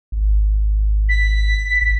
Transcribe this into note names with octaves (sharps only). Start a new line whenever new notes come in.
G#1
B6
G#1